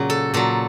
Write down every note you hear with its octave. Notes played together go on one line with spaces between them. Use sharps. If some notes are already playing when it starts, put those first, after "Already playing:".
Already playing: A#2 C#3 F#3
A4
A#2 F#3 A4